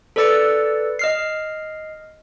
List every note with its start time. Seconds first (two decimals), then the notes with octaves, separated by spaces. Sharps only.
0.16 A4 B4 D5 E6 A6 C#7
0.99 D#5 F6 C7